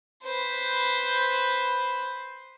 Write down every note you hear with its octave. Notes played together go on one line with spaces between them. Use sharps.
B4 C5